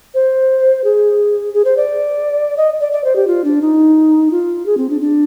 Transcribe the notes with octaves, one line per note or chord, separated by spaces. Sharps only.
C5
G#4
G#4
C5
D5
D#5
D5
D5
C5
G4
F4
D4
D#4
F4
G#4
C4
D4
D4